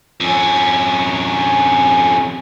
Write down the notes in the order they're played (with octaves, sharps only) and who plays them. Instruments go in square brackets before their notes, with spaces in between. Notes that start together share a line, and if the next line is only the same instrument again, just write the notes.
[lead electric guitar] F2 C#4